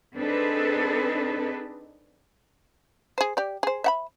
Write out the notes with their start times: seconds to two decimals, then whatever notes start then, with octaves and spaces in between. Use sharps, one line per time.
0.16 C4 D4 D#4 G#4 A4 B4
3.18 G#4 C5
3.37 G4 D5
3.63 G#4 C5
3.84 E5 F#5 B5